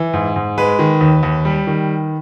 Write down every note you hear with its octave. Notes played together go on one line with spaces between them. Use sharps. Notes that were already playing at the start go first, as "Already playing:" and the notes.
Already playing: E3
G#2
G#2
G#3 B4
D#3
D#2
D#2
G3
D#3